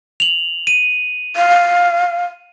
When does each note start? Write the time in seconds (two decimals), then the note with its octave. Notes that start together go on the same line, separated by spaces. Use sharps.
0.20 F7 F#7
0.67 D#7
1.36 F5